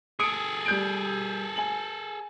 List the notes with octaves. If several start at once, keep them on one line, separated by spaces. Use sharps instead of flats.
G#4 A4 D#6 C#7 D7
G3 G6 D7
G#5 F#7